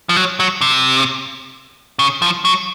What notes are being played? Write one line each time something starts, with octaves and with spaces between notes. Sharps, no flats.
F3
F#3
F#3
C3
C#3
F3
F#3